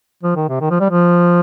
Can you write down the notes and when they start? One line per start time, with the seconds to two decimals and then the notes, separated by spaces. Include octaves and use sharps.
0.23 F3
0.36 D#3
0.49 C3
0.61 D#3
0.70 F3
0.80 G3
0.90 F3